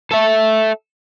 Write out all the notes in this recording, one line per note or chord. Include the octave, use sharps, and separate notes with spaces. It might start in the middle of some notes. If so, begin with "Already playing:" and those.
A4 E5